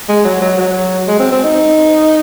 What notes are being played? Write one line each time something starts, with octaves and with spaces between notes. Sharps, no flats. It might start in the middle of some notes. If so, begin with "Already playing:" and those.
G#3
F#3
F#3
F#3
G#3
C4
C4
D#4